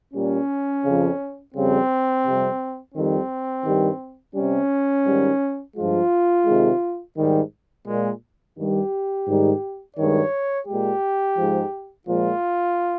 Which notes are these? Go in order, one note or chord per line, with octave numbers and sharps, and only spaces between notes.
A#2 G3 C#4
F2 C#3 F3
F2 C#3 G3 C4
F2 C3 G3
F2 D#3 G3 C4
G2 D#3 G3
C3 G3 C#4
G#2 D#3 G3
G2 F3 G#3 F4
C3 D#3 G#3
G#2 D#3 G3
A#2 G#3
G2 D#3 G3 G4
G#2 D#3 G3
G2 D#3 G#3 C#5
A#2 G#3 G4
G#2 F3 G#3
A#2 F3 G#3 F4